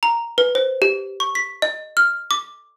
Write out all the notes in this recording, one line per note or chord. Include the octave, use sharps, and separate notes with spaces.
A#5
B4
C5
G4
C#6
B6
D#5
F6
D6